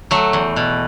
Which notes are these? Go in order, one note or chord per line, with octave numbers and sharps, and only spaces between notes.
F#3 A3
E2
B2